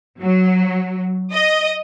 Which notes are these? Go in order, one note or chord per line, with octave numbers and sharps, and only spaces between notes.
F#3
D#5